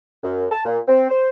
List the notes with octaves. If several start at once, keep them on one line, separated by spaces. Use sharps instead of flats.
F#2
A5
A#2
C4
C5